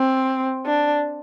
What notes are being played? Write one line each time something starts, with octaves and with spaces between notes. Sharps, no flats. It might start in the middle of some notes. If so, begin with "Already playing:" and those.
Already playing: C4
D4